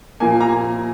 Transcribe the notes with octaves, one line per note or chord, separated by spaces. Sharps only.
A#2 F3 A#3 G#5
A#5